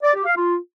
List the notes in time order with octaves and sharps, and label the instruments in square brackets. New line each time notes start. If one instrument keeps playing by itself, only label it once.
[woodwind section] D5
G4
F5
F4